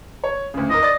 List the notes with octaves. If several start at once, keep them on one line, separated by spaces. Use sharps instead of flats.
C#5
D2 C#3
D#2 A#4 D#5
D5 A6